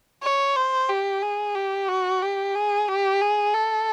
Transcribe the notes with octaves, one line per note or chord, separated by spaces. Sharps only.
C#5
C5
G4
G#4
G4
F#4
G4
G#4
G4
G#4
A4